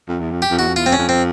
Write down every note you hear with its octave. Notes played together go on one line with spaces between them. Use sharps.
F2
E2
F2
G4
F2
E2 F#4
F2
E2 F4
F2 C4
C#4
F2
C4